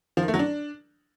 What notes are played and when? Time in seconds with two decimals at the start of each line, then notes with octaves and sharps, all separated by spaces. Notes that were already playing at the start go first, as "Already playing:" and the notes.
0.17 F3
0.23 D#3
0.28 A3
0.34 F#3
0.39 D4